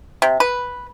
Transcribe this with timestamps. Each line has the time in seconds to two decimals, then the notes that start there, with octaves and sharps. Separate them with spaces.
0.22 C3
0.40 B4